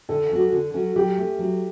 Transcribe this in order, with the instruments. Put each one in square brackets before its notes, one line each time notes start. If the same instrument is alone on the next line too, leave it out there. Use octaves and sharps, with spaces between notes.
[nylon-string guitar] D3 [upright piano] A4
[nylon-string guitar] F#3 C#4 F#4
D3
F#3 C#4 F#4
[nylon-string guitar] F#3 [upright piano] G4
[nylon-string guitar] A3 C#4
F#3